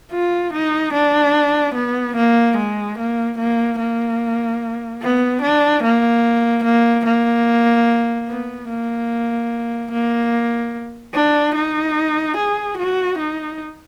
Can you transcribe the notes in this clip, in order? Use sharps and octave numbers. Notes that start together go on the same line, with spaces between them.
F4
D#4
D4
B3
A#3
G#3
A#3
A#3
A#3
B3
D4
A#3
A#3
A#3
B3
A#3
A#3
D4
D#4
G#4
F#4
D#4